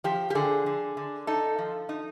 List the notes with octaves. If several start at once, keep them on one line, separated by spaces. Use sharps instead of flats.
F3 G4
G4
D3 G#4
D3
D3
D#4 A4
F3
D#4